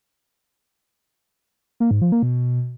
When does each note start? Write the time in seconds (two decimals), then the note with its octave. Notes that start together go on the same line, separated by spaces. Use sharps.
1.80 A#3
1.91 G#2
2.02 F3
2.12 A#3
2.23 B2